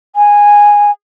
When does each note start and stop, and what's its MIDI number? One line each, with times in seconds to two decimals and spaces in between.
0.16 0.91 80